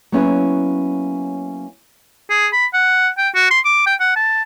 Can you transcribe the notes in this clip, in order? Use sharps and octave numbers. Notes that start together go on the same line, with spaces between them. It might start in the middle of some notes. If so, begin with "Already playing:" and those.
F#3 A#3 B3 C#4 E4 G#4
G#4
B5
F#5
G5
F#4
C6
D6
G5
F#5
A5